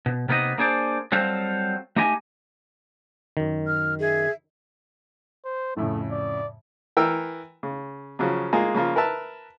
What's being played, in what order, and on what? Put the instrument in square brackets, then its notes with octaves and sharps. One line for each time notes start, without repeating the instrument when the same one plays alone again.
[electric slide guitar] B2
C3 A#3 B3 D#4 D#5
A#3 D4 G#4 C5 D5
F#3 G3 C4 A4 C5 F5
A3 D#4 G4 D#5 G5 G#5
[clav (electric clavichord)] F#2 D#3
[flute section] F6
G#4 E5 G#6
[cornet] C5
[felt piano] F2 A2 C#3 [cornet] A3
[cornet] D5
[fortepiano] E3 A#4 G5 E6
C#3
C#3 F3 F#3
G#3 A#3 F4 G#4
C#3 F3 A#3 F4
A#4 B4 E5 A5